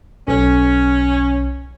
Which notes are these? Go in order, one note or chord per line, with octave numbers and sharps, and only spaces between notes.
B1 C#4